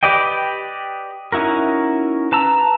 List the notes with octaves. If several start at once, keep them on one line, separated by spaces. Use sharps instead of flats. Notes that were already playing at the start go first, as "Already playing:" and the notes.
G4 B4 D5 D#5 G5
C#4 D#4 E4 F#4 A#4
B4 A5 A#5 E6